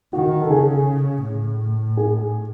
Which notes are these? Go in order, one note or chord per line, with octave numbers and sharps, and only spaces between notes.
D#3 F#4
A4
C#3 G#4
A2
G#4